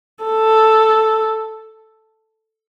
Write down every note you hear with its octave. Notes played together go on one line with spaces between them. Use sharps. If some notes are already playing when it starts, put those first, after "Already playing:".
A4